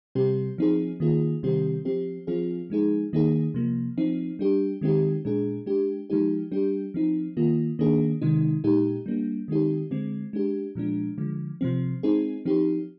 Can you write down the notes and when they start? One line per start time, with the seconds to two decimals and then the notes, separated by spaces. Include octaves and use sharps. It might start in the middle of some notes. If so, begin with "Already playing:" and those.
0.15 C3 G3 C4 G4
0.58 F3 C4 D#4 G#4
1.00 D#3 A#3 F4 G#4
1.43 C3 D#3 G3 C4 G4
1.85 F3 C4 G4
2.27 F3 C4 F4 G#4
2.70 F3 G#3 D#4 G#4
3.13 D#3 A#3 D#4 G#4
3.54 C3 F3 A#3
3.98 F3 C4 D#4
4.39 G3 D4 G4
4.81 D#3 G#3 C4 D#4 G4
5.25 A#2 G#3 D4 G#4
5.66 G#3 D4 G4
6.10 F3 G#3 D#4 G4
6.52 G3 D4 G4
6.94 F3 C4 D#4
7.37 D#3 A#3 F4
7.79 D#3 A#3 D4 G#4
8.22 C3 D#3 G#3 D#4
8.64 A#2 G#3 D#4 G4
9.06 G3 A#3 D4
9.48 D#3 G#3 C4 D#4 G4
9.91 D3 G#3 C4
10.33 G#3 D4 G4
10.75 A#2 F3 G#3 D4
11.18 D3 F3 G#3
11.61 C3 F3 C4
12.03 G#3 C4 D#4 G#4
12.45 F3 C4 D#4 G4